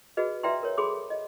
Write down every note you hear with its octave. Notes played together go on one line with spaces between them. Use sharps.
F#4 G#4 B4 D#5
B4 D5 E5 G5 A#5 C6
A#4 C#5
G#4 A4 B5 C6 D6
D#5